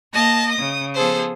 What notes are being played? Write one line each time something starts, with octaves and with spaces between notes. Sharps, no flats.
A#3 D#5 A5 A#6
C#3 D#6
F3 B3 G#4 A4 C5